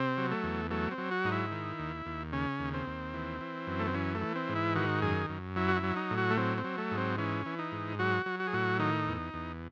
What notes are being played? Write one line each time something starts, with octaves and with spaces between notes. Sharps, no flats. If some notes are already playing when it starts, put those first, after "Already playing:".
Already playing: C3 C4
F#3
A3
E2
F#3 A3
C4
F#3
F#4
G#2 D#4
E4
D#3
D#2
D#2
C#3 C#4
D#2
C4
D#2
E3
E3
F#2
A3
C4
E3 C#4
A3
E3
C4
G#2
E4
D#3 F#4
F#2 G#4
F#2
F#3 E4
F#4
E4
F#3
D#4
A2
F#4
A3
F#3 C4
C4
F#3
A3
G#2
C4
E3 C#4
E3
D#4
G#2
F#3 F#4
F#3
F#4
G#4
A2 F#4
D#3 D#4
E2
E2